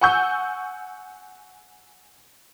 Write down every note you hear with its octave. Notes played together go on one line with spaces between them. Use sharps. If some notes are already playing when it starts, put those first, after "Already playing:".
F#5 G#5 C#6 E6 G6